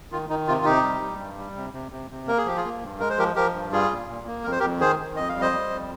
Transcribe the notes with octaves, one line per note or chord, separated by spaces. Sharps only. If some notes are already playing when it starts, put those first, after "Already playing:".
D#3 F4
D#3 D#4
C3 F4
F4
C3 D#4 G4
G3
G3
G2
G3
C3
C3
C3
C3
A#3 A#4
G#4
F3 G4
F4 G#4
A#3
G2
G#3 A#4
C5
F3 G4 A#4
F3 G4 A#4
G2
G3 F4 G#4
A#2
A#2
A#3
F2 A#4
C5
F2 G4 A#4
D#3 G#4 C5
D#3
F2 D#5
F5
G3
C5 D#5
G3
F2